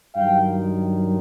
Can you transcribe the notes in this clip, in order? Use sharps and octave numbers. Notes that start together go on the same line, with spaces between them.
G2 D#3 F#3 F5 G5